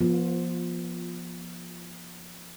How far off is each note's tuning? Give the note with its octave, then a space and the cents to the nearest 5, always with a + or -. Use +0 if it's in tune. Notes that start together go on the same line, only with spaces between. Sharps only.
F3 +0 B3 -35 F4 +10